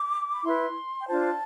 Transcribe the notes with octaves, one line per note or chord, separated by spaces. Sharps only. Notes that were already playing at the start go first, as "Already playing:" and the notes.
Already playing: D6
B5
E4 B4 C6
G5
D4 F4 C5 A5